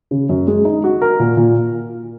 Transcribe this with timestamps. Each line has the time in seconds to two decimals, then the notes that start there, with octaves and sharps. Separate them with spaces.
0.11 C#3
0.29 F#2
0.47 G#3
0.65 D#4
0.84 F#4
1.02 A#4
1.20 A#2
1.37 A#2